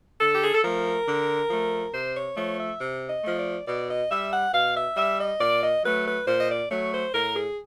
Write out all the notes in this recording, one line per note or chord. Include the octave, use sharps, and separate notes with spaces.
D3 A4
G4
G#4
A4
F3 A3 A#4
D3
F3 A3
C3 C5
C#5
F3 A3 C#5
E5
C3
D#5
F3 A3
D5
B2 D5
D#5
G3 E5
F#5
B2 F5
E5
G3 E5
D#5
A#2 D5
D#5
F#3 A3 B4
B4
A#2 C5
D#5
D5
F#3 A3 C#5
C5
A2 A#4
G#4